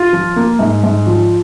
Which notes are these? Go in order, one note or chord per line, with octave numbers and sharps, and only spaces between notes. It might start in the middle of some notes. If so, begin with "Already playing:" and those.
Already playing: F4
F3
A#3
G#2
G#2
F3